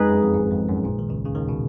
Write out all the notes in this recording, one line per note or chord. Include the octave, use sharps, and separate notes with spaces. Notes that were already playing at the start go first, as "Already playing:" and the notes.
Already playing: F2 G#3 D#4 G#4 B4
F#2
F2
G#1 G#2
F2
F#2
A#1 A#2
D#3
C#2 C#3
C#3
D#2 D#3
B2